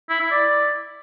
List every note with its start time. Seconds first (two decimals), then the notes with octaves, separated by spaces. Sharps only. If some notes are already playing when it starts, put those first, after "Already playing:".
0.10 E4
0.20 E4
0.31 D5